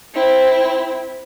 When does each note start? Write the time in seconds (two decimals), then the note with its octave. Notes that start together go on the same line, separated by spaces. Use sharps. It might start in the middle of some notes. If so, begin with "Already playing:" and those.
0.14 C4 E4